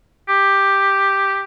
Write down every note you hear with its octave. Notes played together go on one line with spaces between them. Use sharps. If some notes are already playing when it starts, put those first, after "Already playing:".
G4